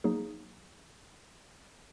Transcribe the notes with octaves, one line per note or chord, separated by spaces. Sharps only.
F#3 A#3 D#4 G#4